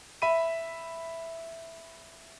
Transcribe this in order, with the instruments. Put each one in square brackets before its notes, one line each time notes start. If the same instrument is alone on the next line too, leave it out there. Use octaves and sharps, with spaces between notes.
[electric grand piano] E5 B5 D#7